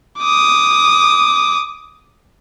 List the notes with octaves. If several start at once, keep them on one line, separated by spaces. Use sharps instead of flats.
D6 D#6